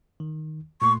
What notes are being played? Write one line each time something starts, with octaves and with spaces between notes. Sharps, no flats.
D#3
A#2 A3 C6 C#6